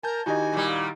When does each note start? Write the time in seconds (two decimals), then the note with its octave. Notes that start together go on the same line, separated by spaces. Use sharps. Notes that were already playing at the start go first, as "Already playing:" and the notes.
0.03 A#4 G#5 A5 G6
0.26 D#3 D#4 E4 F#4 G4 D#5 G#5
0.53 A#2 G3